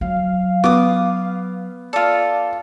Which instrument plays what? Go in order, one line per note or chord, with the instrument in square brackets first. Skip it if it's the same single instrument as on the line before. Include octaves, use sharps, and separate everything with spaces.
[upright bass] F#3 [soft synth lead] F5
[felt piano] B3 [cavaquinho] D6 D#6
[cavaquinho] F4 A4 [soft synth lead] D5